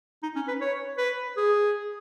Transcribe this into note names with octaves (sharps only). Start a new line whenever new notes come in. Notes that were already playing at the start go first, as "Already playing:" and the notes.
D#4
C#4
B4
C#5
B4
G#4